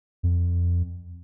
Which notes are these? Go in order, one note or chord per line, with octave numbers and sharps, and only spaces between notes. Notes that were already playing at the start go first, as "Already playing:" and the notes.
F2